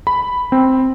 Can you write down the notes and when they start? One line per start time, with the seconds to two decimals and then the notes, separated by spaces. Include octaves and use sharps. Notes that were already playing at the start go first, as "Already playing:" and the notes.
0.07 B5
0.52 C4